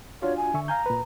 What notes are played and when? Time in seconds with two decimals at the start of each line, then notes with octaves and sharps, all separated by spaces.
0.22 D4 F4 F#4 C#5
0.37 G#5
0.54 D3 E5 C#6
0.68 F5 G#5 A#5 G6
0.86 A#2 B4